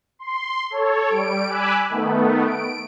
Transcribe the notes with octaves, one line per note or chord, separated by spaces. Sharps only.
C6
A4 C#5
G3 D7
G#5 B5 D6 E6 F#6
D#3 A3 B3
D7